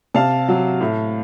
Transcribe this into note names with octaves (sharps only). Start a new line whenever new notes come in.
C3 F5 A5
F#3
A2